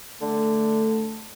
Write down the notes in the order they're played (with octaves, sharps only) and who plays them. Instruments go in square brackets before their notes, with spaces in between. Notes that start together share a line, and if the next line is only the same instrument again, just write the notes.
[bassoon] D3 [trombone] A3